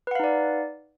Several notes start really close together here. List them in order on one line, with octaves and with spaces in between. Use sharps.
B4 F#5 F5 D#4 D5